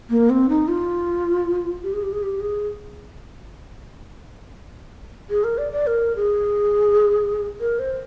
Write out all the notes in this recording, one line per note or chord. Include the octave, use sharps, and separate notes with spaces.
A#3
C4
D#4
F4
G4
G#4
G4
G#4
G4
G#4
G#4
A#4
D5
D5
A#4
G#4
A#4
C5